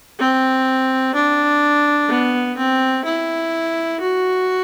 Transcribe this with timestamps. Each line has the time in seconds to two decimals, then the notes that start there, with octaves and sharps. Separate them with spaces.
0.19 C4
1.15 D4
2.09 B3
2.57 C4
3.04 E4
4.01 F#4